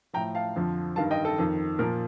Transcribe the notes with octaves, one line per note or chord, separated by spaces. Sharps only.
A2 F3 G5 A#5
F5 A5
F2 D3 F3
G2 D#3 F5 A5
D#5 G5
A4
F2 D#3
A#2 F3 A#4